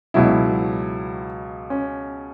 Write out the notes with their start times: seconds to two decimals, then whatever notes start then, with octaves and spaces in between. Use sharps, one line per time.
0.14 C#2 B2 F#3 E4
1.70 C#4